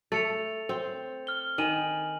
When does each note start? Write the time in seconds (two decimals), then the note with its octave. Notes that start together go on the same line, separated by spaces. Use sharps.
0.12 A3 A6 C#7 F7
0.69 C4
1.27 F6 G7
1.58 D#3 G#5 D#7 F#7